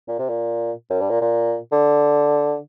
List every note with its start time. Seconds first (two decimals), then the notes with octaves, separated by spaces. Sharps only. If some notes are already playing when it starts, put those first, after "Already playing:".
0.08 A#2
0.19 C3
0.29 A#2
0.90 F#2
1.00 G2
1.10 A#2
1.21 A#2
1.72 D3